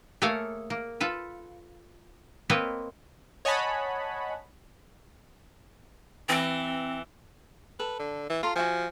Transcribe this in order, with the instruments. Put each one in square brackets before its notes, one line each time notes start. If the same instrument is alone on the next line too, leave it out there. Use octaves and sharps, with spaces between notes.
[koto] A3 A#3 G#4 A4 C#5 F5
A#3
F4 A4 B4
A#3 C4 B4 C#5 D#5
[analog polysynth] C#5 D#5 F#5 G#5 A5 B5
[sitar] E3 [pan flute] C4
[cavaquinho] A4 [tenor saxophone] B4
[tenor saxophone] D3
E3
[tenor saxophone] F4 [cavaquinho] A4 A#5 C6
[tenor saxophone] F3 [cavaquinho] F#4 E5 G#5